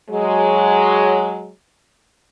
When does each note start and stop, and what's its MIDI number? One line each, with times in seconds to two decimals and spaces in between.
0.10 1.50 54
0.10 1.50 56